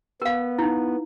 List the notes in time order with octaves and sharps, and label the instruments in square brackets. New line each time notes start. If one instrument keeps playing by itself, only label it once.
[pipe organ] B3 [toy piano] A#4 F5
[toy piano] D#4 E4